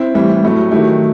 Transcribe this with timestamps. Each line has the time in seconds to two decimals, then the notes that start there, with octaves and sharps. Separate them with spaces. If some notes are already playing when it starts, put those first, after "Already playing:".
Already playing: C4 E4
0.14 A2 E3 G3
0.43 A2 F#3 A3
0.71 D#3 F#3 A3 E4 G4